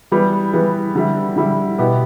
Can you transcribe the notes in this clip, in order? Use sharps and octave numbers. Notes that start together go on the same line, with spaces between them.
E3 G3 B3
E3 G3 B3
D3 G3 E4
D3 G3 E4
B2 B3 E4 G4